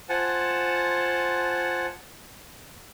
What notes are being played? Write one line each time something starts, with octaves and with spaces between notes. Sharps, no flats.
F4 C5 F#5 G#5 A5